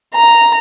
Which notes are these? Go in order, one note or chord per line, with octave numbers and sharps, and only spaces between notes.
A#5